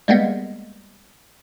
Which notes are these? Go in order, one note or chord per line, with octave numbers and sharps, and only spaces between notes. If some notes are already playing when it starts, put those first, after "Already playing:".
G3 G#3 A#3 B3